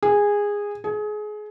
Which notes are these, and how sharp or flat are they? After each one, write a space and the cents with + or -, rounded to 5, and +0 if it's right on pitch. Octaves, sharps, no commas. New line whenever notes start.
G#4 -15
G#4 +25